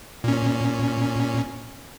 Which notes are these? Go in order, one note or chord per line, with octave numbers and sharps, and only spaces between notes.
A#2 C#4